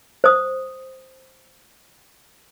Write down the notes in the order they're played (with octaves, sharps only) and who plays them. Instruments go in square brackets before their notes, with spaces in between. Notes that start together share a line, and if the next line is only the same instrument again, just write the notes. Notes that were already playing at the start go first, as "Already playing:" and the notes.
[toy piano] C5 D#6